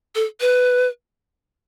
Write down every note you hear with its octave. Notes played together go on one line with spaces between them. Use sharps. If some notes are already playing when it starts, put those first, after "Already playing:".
A4
B4